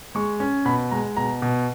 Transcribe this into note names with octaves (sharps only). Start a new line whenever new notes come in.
G#3 C#6
C#4
B2 B5
G#3 A#5
B2 A#5
B2